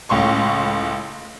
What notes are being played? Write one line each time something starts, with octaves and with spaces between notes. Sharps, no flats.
C#2 A2 C6 C#6